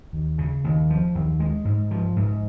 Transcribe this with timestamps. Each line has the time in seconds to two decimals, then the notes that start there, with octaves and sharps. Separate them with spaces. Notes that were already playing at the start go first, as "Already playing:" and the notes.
0.13 D#2
0.38 C#3
0.64 D#2
0.90 F3
1.15 D#2
1.40 G#3
1.65 G#2
1.91 F3
2.16 G#2